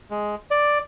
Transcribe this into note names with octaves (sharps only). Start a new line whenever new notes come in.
G#3
D5